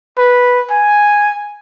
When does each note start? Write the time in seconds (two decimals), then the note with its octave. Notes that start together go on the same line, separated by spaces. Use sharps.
0.18 B4
0.71 G#5